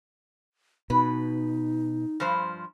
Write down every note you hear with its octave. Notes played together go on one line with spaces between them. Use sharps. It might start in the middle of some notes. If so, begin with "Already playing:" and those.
B2 D#4 B4
G2 F3 C5